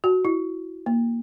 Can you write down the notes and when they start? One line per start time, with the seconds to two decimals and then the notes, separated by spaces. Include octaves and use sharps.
0.04 F#4
0.25 E4
0.86 A#3